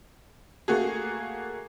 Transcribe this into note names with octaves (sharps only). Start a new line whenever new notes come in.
A3 A#3 F#4 G#4